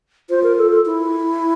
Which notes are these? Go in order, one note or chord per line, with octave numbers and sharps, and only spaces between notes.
F4 C5
A#4
A4
A4
E4